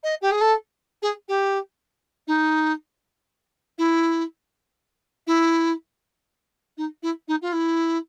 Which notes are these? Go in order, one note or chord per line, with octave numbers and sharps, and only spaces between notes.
D#5
G4
G#4
A4
G#4
G4
D#4
E4
E4
D#4
E4
D#4
F4
E4